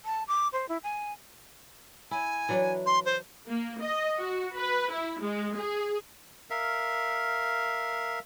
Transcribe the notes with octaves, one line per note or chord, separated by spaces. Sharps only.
A5
D6
C5
E4
G#5
E4 G#5
E3 F#3 D4
C6
C5
A#3
D#5
F#4
B4
E4
G#3
G#4
A#4 E5 F5